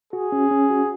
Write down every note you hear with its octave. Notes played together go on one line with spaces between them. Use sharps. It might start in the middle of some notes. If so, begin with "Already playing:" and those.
F#4 G#4
C#4
C#4
F#4